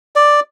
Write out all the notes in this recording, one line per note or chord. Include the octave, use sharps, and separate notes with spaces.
D5